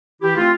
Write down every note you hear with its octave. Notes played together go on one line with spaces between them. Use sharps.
E3 E4 G4
A3 C4 F4